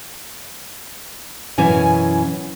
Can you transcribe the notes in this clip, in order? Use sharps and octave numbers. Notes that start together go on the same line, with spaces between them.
F#2 B2 E3 C#4 G#5